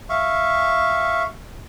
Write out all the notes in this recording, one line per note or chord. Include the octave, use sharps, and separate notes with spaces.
E5 F5 C#6